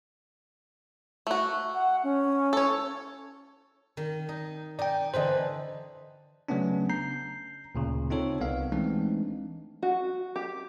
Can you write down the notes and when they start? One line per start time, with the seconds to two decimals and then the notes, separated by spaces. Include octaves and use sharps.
1.27 A3 F#4
1.74 F#5
2.04 C#4
2.53 A4 C#5
3.97 D#3
4.29 D#4
4.79 D#4 D5 G5
5.14 D3 E3 B4 C5 D#5
6.48 C#3 F#3 A3 B3 C#4 D4
6.89 A#5 G6 C7
7.75 D2 A#2 C#3
8.10 C4 D#4 F4 A4 C#5
8.40 C2 B3 F5
8.72 E3 G#3 A3 C4 D4 D#4
9.83 F#4
10.36 G4